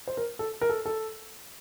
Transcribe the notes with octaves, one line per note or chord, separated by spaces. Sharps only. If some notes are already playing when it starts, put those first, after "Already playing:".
C5
A#4
A4
A#4
A4
A4